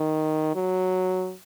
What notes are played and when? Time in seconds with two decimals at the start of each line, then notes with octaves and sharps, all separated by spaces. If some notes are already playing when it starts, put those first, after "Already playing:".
Already playing: D#3
0.55 F#3